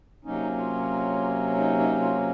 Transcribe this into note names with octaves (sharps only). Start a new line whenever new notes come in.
C3 F#3 A#3 C#4 D#4
F4
D#4
D#4
F4